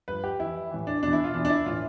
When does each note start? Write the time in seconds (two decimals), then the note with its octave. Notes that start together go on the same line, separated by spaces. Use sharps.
0.08 G2 F3 B4
0.24 G4
0.40 F2 E3 E4
0.71 A2 E3
0.87 D4
1.03 E2 B2 D4
1.13 E4
1.24 F4
1.34 E2 B2 D4
1.45 D4
1.50 E4
1.66 A2 E3 F4